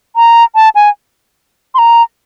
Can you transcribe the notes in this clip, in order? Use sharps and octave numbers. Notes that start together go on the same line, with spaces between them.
A#5
A5
G#5
C6
A#5